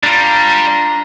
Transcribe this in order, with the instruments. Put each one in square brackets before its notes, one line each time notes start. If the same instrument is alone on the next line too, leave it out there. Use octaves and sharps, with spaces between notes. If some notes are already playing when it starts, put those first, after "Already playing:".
[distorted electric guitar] G3 [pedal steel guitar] D4 F4 [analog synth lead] A#5